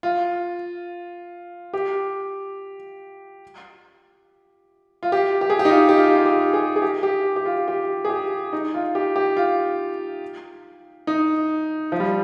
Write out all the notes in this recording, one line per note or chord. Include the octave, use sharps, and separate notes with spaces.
F4
G4
F4
G4
G4
G#4
G4
D#4
F4
G4
F4
F4
G4
G#4
G#4
G4
G4
G4
F4
G4
G#4
G4
D#4
F4
G4
G4
F4
D#4
F3
G3